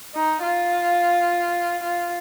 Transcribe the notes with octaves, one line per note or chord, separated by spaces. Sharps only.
D#4
F4
F4